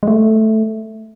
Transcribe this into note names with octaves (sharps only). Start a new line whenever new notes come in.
G#3
A3